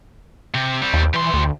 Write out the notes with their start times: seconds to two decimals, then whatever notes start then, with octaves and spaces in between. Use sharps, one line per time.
0.54 C3 C4
0.82 G3 C4
0.93 D#2
1.14 E3 G3 C6
1.33 D2